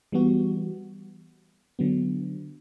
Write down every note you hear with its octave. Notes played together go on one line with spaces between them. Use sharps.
E3 G3 B3 F#4
D3 F#3 B3